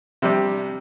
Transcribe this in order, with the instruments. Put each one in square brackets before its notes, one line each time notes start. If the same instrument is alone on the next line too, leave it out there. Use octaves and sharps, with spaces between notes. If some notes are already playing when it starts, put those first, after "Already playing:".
[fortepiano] C3 G3 D4